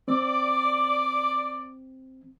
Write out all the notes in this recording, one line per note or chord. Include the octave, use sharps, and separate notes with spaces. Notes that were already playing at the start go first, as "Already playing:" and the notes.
C4 D5